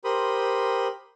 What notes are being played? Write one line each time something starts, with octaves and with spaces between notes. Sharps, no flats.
G4 A#4 C5 B5 C6 D#6